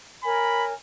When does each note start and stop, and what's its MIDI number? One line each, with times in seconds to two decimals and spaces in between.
0.24 0.72 70
0.24 0.72 73
0.24 0.72 80
0.24 0.65 83